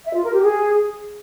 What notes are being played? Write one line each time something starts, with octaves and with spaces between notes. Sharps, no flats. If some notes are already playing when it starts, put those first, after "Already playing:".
E5
F4
A#4
G4
G#4